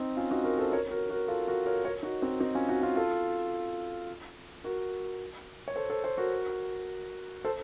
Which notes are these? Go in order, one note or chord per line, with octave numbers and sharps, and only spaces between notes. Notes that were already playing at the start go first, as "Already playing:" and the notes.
Already playing: C4 D#4
C#4 F4
D#4 F#4
F#4 A#4
A4 C5
A#4 C#5
F#4 A#4
F#4 A#4
F4 A4
F#4 A#4
A#4 C#5
A#4 C#5
D#4 F#4
C4 D#4
C4 D#4
C#4 F4
D#4 F#4
C#4 F4
F4 A4
F#4 A#4
C#5
A4 C5
A4 C5
A4 C5
F#4 A#4
A4 C5